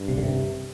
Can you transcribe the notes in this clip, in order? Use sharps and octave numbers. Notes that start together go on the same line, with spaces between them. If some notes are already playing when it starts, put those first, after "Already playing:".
Already playing: G2
C3
D3
C3